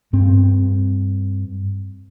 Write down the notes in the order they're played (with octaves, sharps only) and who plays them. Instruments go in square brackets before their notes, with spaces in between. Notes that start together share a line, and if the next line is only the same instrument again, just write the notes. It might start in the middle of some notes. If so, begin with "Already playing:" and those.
[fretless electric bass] G2 C4